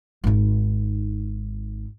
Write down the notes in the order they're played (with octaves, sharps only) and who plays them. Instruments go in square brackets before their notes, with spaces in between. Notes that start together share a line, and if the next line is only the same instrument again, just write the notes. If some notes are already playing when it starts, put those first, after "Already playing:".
[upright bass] G#1 D#4